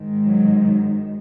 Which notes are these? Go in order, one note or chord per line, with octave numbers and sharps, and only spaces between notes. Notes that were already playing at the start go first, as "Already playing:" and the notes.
Already playing: G#2 D#3
F#3